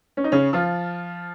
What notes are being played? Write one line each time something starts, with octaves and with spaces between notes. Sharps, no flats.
C#4
D#4
C#3 C#4
F3 F4